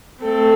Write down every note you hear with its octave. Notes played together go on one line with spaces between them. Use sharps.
A3 C4 A4